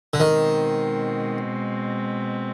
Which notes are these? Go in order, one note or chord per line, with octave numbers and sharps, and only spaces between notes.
D3
B2 D#3 G#3 C4